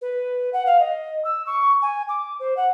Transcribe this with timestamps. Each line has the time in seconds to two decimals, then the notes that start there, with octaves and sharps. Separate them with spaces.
0.01 B4
0.53 F#5
0.66 F5
0.80 D#5
1.24 E6
1.46 C#6
1.82 G#5
2.08 D6
2.39 C5
2.57 F#5